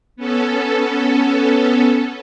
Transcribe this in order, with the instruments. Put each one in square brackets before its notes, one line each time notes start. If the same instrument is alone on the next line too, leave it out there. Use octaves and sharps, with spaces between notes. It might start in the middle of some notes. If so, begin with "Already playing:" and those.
[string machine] B3 C#4 A4